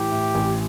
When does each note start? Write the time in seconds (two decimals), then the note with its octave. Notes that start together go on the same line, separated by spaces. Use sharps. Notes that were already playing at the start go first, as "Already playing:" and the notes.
Already playing: A2 E3 G4
0.12 A2
0.35 A1